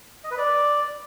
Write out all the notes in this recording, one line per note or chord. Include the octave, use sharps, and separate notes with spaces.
D#5
B4
D5